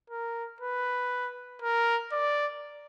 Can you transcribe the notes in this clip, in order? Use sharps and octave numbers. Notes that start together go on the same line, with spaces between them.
A#4
B4
A#4
D5